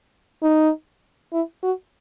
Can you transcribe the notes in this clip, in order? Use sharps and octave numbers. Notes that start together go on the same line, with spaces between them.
D#4
E4
F#4